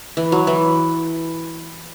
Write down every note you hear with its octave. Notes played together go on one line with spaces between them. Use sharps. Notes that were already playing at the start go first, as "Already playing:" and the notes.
E3
F#3
E3